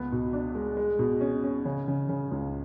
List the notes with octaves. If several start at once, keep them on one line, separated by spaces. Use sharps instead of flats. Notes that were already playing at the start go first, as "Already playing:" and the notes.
Already playing: C#2 B3
B2
D4
G#3
G#3
B2
C#4
C#4
C#3
C#3
C#3
C#2